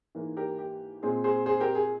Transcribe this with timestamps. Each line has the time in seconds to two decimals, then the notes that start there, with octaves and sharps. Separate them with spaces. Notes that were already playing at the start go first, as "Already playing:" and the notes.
0.15 G#2 E3 A#3
0.37 G4 A#4
0.59 G4
1.03 A#2 G#3 C4 G#4
1.24 G#4 C5
1.46 G#4 C5
1.60 G4 A#4
1.75 G#4